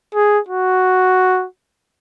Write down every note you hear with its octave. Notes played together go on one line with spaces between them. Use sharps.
G#4
F#4